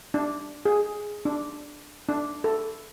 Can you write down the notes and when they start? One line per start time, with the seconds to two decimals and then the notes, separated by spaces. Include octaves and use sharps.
0.14 D4
0.65 G#4
1.25 D4
2.09 D4
2.44 A4